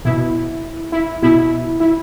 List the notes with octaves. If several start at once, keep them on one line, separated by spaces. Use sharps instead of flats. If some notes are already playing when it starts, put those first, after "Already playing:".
B2 E4
E4
B2 E4
E4